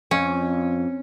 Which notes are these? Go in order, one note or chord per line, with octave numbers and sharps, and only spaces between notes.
F2 C#4